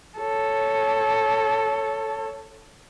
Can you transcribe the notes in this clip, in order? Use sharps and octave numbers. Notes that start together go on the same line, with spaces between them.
A4 C#5